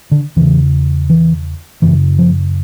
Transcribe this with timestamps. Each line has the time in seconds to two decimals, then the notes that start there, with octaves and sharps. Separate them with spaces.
0.11 D3
0.36 E2 C#3 E3
1.10 E3
1.82 F#2 C#3 E3
2.18 F3